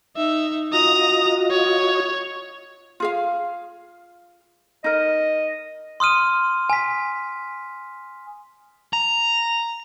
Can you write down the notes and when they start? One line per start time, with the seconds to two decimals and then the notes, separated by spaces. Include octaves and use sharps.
0.17 D#4 E5
0.73 F4 F#4 D#5 A#5 D#6
1.51 C#5
3.00 F4 G#4 F5
4.84 D#4 A#4 D#5
6.00 C6 D#6 F6 D#7
6.70 G#5 B6
8.93 A#5